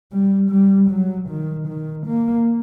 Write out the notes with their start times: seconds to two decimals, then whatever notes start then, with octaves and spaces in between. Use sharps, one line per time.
0.13 G3
0.51 G3
0.90 F#3
1.30 D#3
1.69 D#3
2.07 A#3